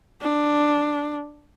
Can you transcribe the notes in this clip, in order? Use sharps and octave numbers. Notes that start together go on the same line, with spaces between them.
D4